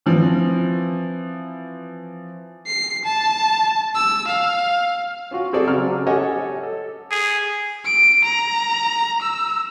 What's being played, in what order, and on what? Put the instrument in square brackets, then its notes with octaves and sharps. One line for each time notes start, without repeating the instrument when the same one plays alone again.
[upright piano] E3 F3 C4
[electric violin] C7
A5
E6
F5
[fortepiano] C#4 F4 F#4
C4 G#4 A4 D5
C#3 F#3 D5 A#5 F6
G4 A4 C#5 D#5 F#5 G#5
A4
[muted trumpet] G#4
[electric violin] D7
A#5
E6